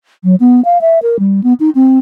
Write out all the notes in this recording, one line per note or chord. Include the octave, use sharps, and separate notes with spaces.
F#3
B3
F5
E5
A#4
G3
B3
D#4
C4